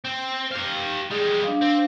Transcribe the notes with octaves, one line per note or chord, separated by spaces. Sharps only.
C4
G4 F5
G3 G#3 G#4
D4 F5
C4